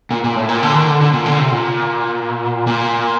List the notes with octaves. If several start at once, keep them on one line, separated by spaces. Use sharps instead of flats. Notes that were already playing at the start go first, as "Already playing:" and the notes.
A#2
A#2
A2
A#2
D3
D#3
D3
D3
A#2
D3
C3
A#2
A#2